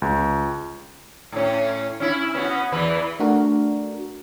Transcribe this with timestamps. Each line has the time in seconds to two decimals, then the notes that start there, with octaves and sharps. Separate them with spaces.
0.02 C#2
1.32 A2 C#4
2.00 C#4 E4
2.35 B3 C#4 F#4
2.72 E2 E3 B4
3.19 A3 D4 F#4 A#4